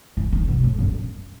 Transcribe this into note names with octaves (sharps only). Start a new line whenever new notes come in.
E3
D#3
B2
A2
F#2